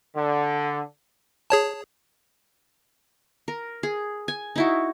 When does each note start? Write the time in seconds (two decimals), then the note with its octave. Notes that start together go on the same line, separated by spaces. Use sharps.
0.15 D3
1.50 G#4 C#5 A5
3.48 A#4
3.83 G#4
4.28 G#5
4.56 D#4 E4 F#4